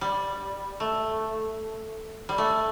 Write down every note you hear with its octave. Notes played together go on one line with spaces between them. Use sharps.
G3
A3
G3
A3